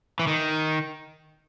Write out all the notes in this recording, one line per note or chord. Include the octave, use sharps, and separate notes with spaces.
E3
D#3